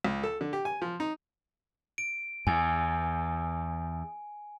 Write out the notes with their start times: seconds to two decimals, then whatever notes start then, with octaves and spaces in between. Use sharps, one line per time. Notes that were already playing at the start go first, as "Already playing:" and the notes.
0.04 C#2
0.23 A4
0.41 D3
0.53 G4
0.65 G#5
0.82 F3
1.00 D#4
1.98 D7
2.47 E2 G#5